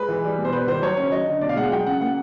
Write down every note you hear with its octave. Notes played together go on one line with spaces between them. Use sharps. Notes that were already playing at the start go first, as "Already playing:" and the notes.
Already playing: G#3 B4
E3
G3
B2
C5
G3 B4
D#3 C5
F#3 C#5
C#3
F#3 D#5
D3
B2 D5
F5
G#3 F#5
F#3 G5
C#3 F#5
A#3 F#5